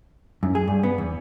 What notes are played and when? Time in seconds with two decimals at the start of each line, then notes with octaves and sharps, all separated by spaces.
0.43 F#2
0.55 G#4
0.68 G2
0.83 B3
0.98 E2